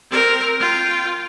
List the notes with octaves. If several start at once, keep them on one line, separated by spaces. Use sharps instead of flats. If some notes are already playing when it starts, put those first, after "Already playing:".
C4 A#4
F4 G5